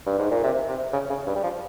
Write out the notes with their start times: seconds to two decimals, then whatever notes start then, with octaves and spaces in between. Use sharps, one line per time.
0.06 G2
0.19 G#2
0.31 A#2
0.44 C3
0.68 C3
0.93 C#3
1.10 C#3
1.26 G2
1.36 G3
1.44 F3